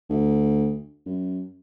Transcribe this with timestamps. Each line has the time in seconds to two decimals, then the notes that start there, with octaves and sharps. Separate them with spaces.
0.09 D2
1.06 F#2